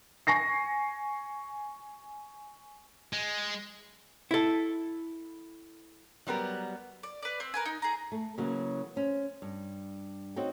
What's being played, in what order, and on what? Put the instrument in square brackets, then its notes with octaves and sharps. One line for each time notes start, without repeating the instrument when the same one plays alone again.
[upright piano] G#5 C#6 A#6 C7
[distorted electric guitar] G#3
[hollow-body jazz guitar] E4 A4
[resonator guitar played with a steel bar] F#3 G3 B3 A#4
[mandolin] D5
B4 D5
C4
A#4 B4 G#5
D#4
G#4 A#5
[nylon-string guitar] A3
C#3 E3 F#3 A#3 F#4
C#4 C5
G2
C4 D#4 F#4 C5 C#5 G5